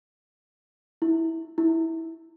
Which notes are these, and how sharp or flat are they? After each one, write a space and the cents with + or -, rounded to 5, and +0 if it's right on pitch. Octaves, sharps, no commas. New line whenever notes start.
E4 -15
E4 -15